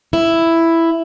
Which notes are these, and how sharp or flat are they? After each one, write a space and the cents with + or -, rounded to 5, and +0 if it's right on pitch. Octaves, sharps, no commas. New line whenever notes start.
E4 +5